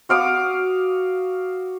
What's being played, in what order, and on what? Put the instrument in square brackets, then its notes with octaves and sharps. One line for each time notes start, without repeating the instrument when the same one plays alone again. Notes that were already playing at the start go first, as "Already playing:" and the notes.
[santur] F#4 F5 D6 D#6